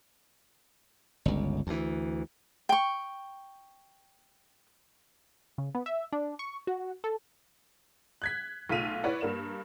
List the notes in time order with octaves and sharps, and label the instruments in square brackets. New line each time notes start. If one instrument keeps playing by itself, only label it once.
[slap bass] G1 C#2
D2 E3
[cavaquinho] G5 C#6
[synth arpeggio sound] C#3
B3
E5
D4
C#6
F#4
A4
[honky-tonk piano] F#6 G#6 B6
B1 A3 F4 B6 D#7 F7
E4 B4 C#5 D5 F#5
G2 A#3 E7